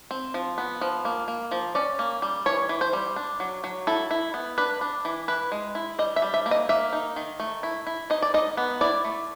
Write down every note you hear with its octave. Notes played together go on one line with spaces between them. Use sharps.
C4
F3
B3
F3
A#3
A#3
F3
C#4 D5
A#3
G3
E3 C#5
E3
C5
G3
D4
F#3
F#3
E4 A4
E4
B3
D4 B4
D4
E3
E4 B4
G#3
E4
G3 D#5
E5
G3
E5
A#3
D#5
A#3 E5
D#4
D#3
A3
E4
E4
D#4 D#5
D5
D#4 D#5
B3
E4 D5
A3